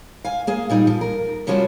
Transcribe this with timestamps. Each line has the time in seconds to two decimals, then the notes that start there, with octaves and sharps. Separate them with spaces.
0.24 F5 G#5
0.47 A#3 G#4 F5
0.70 A#2 G3 D#4
0.87 F3
1.01 A#4
1.47 C3 F3 G3 C#4 F#4 C5